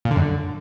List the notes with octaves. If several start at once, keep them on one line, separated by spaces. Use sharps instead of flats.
A#2
D3
F#2
D3